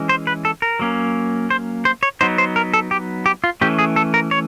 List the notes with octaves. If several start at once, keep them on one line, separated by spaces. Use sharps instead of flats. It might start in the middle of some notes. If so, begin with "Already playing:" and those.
Already playing: E3 G#3 C#4
C5
B4
A4
A#4
F#3 A#3 C#4
C5
C5
C#5
F#3 B3 D#4 C5
C5
A#4
A4
G4
G4
F4
E3 A3 C#4 G4
G#4
A4
A#4
C#5